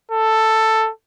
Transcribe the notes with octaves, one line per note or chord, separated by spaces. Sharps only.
A4